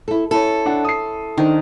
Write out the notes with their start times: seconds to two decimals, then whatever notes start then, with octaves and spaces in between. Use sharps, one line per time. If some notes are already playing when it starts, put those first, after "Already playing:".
0.08 E4 A4
0.31 C#4 E4 A4
0.66 D4 F#5
0.85 D#6 C7
1.38 D#3 D4 C5